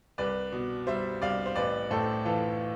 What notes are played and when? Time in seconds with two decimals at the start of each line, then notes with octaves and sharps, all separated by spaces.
0.18 C2 B4 D5
0.52 B2
0.87 G3 C5 E5
1.22 C2 D5 F5
1.46 C5
1.56 A1 B4 D5
1.90 A2 A4 C5
2.25 E3 F4 A4